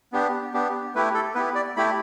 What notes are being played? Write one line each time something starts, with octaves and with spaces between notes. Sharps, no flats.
B3 D4 G4
B3 D4 G4
A3 E4 G4 B4
A4
B3 E4 G4 B4
D5
A3 E4 G4 B5